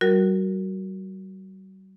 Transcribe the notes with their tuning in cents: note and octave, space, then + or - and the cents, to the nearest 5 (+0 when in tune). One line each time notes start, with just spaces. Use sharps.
G3 -45 F#4 +0 A#4 +0